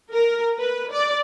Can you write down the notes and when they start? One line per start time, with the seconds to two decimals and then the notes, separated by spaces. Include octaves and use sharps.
0.12 A#4
0.59 B4
0.92 D5